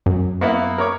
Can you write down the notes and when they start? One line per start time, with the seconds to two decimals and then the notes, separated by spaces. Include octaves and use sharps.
0.06 F#2
0.41 A#3 B3 E4
0.78 A#4 C#5 D6